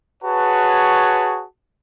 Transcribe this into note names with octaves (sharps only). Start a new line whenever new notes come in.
F#4 G#4 B4 C#5 A5